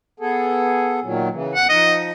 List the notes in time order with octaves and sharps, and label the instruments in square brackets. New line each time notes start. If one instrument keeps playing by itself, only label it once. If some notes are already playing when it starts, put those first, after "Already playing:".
[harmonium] B3 G#4 A4
A#2 D#3 F#3
C#3 E3
[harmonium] E2 [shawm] F#5
[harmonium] F3 D#4 [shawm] D#5